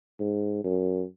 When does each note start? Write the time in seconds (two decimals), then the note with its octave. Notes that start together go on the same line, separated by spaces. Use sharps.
0.20 G#2
0.64 F#2